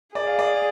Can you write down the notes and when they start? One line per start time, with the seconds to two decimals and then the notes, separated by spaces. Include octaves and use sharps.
0.15 G#4 D5
0.27 F5
0.39 D5